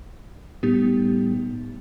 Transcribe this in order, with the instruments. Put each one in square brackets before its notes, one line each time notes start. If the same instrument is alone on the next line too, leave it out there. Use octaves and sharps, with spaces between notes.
[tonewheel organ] A2 G3 [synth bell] B3 D#4 G4